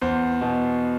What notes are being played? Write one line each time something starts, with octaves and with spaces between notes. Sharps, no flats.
E2 C5
B2